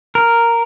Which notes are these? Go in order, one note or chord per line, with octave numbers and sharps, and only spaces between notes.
A#4